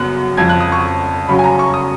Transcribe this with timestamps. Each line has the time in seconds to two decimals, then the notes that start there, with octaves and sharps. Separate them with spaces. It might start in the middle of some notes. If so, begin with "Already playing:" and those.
Already playing: F#2 C#3 F#3 B3 F#6
0.37 F2 C#3 F3 G#6
0.49 F#6
0.60 D#6
0.72 C#6
1.28 F#2 C#3 F#3 C#4 B5
1.39 G#5
1.44 A#5
1.59 C#6
1.74 D#6